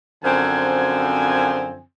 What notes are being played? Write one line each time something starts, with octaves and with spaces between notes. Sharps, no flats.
F#2 D3 F3 C4 G#5